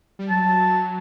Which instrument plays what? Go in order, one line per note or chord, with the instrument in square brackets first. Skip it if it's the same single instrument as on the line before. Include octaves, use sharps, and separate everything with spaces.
[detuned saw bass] G3
[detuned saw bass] F#3 [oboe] A5